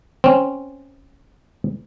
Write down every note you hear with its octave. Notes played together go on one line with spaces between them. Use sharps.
C4 C#4